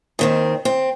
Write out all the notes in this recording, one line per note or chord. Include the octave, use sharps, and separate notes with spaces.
D#2 D#3 C4
C4